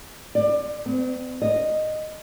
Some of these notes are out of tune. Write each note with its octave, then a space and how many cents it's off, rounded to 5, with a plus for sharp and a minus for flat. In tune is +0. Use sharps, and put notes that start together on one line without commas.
D5 +25
C4 -45
D#5 -10